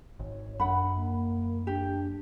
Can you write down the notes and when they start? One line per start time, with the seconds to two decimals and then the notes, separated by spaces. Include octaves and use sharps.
0.19 G#1 C#5
0.60 F#2 D4 F#5 B5
0.96 A#3
1.67 D4 G4